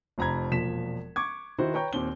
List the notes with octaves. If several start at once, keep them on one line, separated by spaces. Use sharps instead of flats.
F1 F2 A#5 B5 G#6
E1 A#2 F3 B6 E7
C#6 D6 G#6
D#3 E4 F#4 C5
B4 C#5 G5 A#5 C#6 G6
D#2 A#2 C4 G7